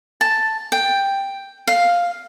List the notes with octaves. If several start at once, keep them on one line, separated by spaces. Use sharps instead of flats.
A5
G5
F5